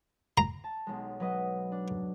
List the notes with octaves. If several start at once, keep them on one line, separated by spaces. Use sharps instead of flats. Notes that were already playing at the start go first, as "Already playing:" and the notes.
A#5
A5
B1 G#3
F#3 B4 D#5
D4